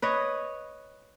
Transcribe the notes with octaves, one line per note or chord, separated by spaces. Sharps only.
B4 C#5 D#5